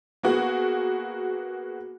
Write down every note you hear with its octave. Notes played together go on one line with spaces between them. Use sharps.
A#3 B3 F#4 G#4